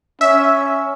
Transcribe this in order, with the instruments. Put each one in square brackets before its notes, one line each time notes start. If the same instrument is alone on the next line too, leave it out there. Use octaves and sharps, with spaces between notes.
[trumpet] C#4 [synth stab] E5